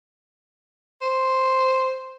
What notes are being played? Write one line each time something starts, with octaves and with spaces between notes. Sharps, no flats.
C5